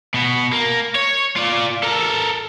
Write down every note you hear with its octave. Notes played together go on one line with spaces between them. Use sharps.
B2 B3
A#3
C#5
F4 D5
A4 A#4